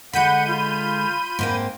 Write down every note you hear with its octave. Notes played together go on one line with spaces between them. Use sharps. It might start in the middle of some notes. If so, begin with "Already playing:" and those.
D3 G#3 F#5 B5 G6 D#7
F4
G#2 A#3 C4